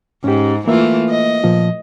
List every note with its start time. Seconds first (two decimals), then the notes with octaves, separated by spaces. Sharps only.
0.24 G#2 C#4 G4
0.68 E3 A3 A#3 F4 E5
1.10 D#5
1.44 A#2 F3